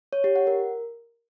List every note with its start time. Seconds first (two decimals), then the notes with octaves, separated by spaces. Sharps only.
0.13 C#5
0.24 G4
0.36 F#5
0.47 A#4